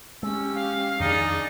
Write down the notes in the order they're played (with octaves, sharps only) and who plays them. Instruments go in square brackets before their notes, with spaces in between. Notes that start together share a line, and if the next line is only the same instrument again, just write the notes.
[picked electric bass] G#3 [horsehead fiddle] C#4 G4 [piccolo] E6
[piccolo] F5
[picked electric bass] F2 D#3 D4 [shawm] D#4 [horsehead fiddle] G#4 D5